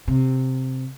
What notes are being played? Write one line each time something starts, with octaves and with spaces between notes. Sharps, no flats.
C3